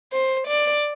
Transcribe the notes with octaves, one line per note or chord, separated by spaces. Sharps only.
C5
D5